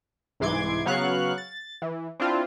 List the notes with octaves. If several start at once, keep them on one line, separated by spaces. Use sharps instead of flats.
C2 G#2 E3 C6 D6 G#6
C#3 F#3 B3 F5 C#6 F#6
A6
E3
C4 D4 E4 F4